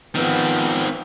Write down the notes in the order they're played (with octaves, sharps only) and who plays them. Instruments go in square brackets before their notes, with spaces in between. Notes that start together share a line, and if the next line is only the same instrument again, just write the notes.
[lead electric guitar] D#3 C4 [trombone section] F3 B3